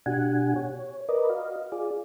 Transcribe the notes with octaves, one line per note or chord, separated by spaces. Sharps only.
B2 D4 F#4 G4 F#5 G#5
C#5
A#4 B4 D5 D#5
F#4 D#5 F5
F4 G#4 D5